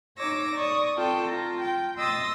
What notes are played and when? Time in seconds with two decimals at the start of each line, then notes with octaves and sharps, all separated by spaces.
0.19 D#4 C#5 D6 E6 A#6
0.56 D5 C#6 D#6
0.95 C4 F4 A4 G5
1.29 F4 A#5
1.63 G5
1.99 D#5 C6 D#6 E6 A6